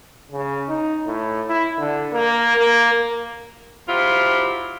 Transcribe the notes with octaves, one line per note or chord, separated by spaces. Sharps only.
C#3
D#4
A2
E4
D3
A#3
A#3
F#3 C4 E4 F4 G4